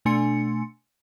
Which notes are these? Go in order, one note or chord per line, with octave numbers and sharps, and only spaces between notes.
B2 A3 D4 G#5 C6 C#7